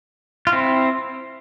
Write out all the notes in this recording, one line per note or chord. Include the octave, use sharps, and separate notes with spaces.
F4
C4 E4